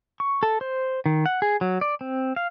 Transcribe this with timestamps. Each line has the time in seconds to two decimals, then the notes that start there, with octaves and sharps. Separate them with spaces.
0.20 C#6
0.43 A4
0.61 C5
1.06 D#3
1.26 F#5
1.42 G#4
1.61 F#3
1.81 D5
2.01 C4
2.36 F5